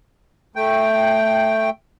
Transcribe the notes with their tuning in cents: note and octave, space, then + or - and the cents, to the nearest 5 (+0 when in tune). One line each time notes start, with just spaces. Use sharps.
A3 +0 G5 +0